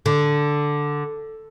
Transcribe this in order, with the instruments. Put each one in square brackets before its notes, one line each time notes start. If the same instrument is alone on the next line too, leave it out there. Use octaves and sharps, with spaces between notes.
[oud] D3